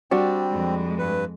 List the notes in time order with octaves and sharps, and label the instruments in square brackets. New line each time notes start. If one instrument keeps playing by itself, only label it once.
[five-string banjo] G3 D4 F#4 [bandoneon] C4
[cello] F2 G#3
[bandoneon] G2 B4